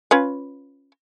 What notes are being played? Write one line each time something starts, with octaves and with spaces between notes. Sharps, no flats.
C#4 F4 B4